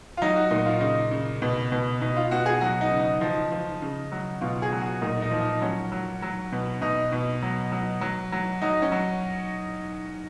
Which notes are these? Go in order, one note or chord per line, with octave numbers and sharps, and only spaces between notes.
F4
F#3 D#4
F#4
A#2 D#4
F4
C#3 D#4
C#3
B2
B2
B2 D#4
F4
B2 F#4
G#4
F#3 F#4
D#4
C#3
D#4
F3 D#4
F3
C#3
F#3
B2 F4
G#4
F#3
F#4
A#2 D#4
D#4
F3
D#4
F#3 C#4
F#3
F#3
B2
B2 D#4
B2
F#3
F#3
F#3
F#3
F#3 D#4
C#4
F#3